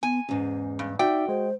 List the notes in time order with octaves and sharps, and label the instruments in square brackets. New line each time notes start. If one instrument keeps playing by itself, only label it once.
[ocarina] B3 [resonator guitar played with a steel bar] G#5
[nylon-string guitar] E2 G#2 [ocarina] C#4
[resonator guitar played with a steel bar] G2
[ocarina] D#4 [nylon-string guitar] F#4 [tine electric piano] D5 E5 [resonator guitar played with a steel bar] G5
[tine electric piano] G#3 [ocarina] C5